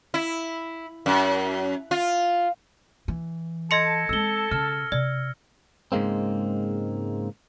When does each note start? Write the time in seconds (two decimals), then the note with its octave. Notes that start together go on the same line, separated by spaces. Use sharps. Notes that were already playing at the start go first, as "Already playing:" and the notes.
0.14 E4
1.06 F#2
1.91 F4
3.08 E3
3.71 A4 D#5 A5 C6 G#6 A#6 C#7 F7
4.09 G#3 C4 E6 G7
4.51 C#3 F6
4.92 C3 D5
5.92 G#2 C#3 G#3 A#3 C4